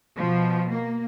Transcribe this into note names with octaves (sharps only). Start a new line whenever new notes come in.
B2 F3
A#3